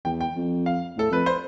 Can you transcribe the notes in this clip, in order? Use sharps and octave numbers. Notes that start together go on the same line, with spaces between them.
E2 G5
G5
F2
F5
A2 A4
F2 B4
C5